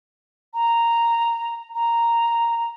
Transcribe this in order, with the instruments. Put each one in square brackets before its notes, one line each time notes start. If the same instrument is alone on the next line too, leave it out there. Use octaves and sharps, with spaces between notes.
[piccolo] A#5
A#5